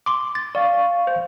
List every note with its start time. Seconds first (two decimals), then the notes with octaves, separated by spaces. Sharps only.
0.06 C6 D6
0.35 A6
0.55 D5 F5 C#6
1.07 C5